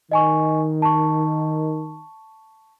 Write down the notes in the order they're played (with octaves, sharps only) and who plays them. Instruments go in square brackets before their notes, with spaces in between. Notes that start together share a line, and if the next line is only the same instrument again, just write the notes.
[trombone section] D#3 [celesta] D#5 G#5 C#6
[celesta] A5 C#6